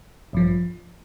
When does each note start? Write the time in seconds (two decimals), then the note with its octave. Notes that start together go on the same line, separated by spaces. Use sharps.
0.33 A1 G2 F3